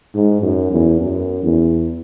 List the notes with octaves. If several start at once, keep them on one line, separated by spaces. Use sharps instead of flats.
G#2
F#2
E2
F#2
E2